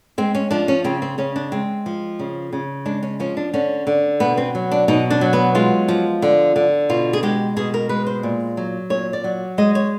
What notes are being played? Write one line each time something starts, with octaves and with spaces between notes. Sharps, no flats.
G#3 C4
C#4
F3 D4
C#4
C#3 C4
C4
C#3 C#4
D4
G#3 C4
F3
C#3
C#3
G#3 D4
C#4
F3 C#4
D4
D3 C#4
D3
B2 B3
C4
F#3
D4
B2 D#4
D4
F#3
B3
G#3 F4
F3
D3
D3
B2 F4
G#4
G#3 G4
B2 G#4
A#4
G#3 B4
C5
A#2
F#3
A#2 C#5
D5
F#3
G#3 D#5
C#5